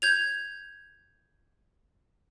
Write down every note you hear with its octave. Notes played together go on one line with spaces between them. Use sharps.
G6 G#6 F7